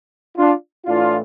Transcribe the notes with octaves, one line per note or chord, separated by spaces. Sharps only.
D4 F4
A2 E3 D4 F4